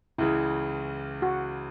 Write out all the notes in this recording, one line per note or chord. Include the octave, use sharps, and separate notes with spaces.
C#2 C#3 E3 E4
F#4